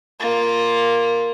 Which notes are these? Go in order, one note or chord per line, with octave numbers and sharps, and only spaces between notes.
A#3 F4